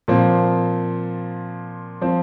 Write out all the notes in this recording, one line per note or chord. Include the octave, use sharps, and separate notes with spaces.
A#2 F3 C4
F3 C4